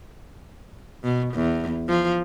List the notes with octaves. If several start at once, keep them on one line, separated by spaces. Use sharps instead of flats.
B2
E2
F3